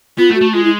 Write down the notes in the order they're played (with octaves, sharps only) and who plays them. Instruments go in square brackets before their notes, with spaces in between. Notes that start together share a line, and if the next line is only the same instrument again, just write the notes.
[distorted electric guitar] B3 [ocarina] F4
[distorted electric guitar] A3
[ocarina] F#4
[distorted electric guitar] A3
[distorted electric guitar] G#3 [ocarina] F4
[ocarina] E4